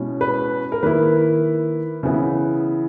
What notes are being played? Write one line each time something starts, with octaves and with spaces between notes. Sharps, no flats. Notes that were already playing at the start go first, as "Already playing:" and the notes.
Already playing: B2 G#3 C#4 E4
B4
A#4
D#3 A#3 E4 B4
C#3 E3 B3 E4